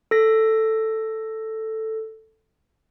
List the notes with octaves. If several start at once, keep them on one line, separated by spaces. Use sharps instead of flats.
A4 A#6